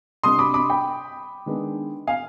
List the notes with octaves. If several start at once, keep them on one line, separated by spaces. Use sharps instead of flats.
C3 G3 D4 C6 D#6
B5 D6
B5 D6
G5 B5
D#3 G#3 B3 D4
F5 G#5